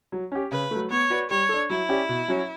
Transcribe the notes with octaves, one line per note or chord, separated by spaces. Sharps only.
F#3
C#4 G4
C#3 B4
F#3 A3
B3 C#5
F#4 B4 D5
G3 C#5
D4 A4
F#3 E4
C#4 G4 D5
B2
F#3 C#4 F#4 C#5